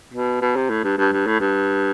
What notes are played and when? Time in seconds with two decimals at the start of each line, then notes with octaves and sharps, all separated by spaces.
0.14 B2
0.42 B2
0.56 C3
0.70 A2
0.84 G2
0.98 G2
1.12 G2
1.27 A2
1.40 G2